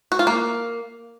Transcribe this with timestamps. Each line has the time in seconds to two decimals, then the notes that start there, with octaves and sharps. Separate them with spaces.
0.12 F#4
0.19 F4
0.27 A#3